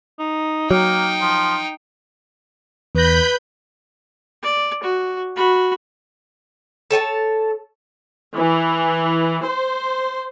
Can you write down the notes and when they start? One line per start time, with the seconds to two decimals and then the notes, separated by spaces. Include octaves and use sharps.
0.19 D#4
0.71 F#3 A#3 D#4 G5
1.21 F3
2.95 E2 B4 B5 G6 A#6
4.43 D5
4.83 F#4
5.36 F#4 B5
6.91 A4 C#5 G#5 A5
8.35 E3
9.45 C5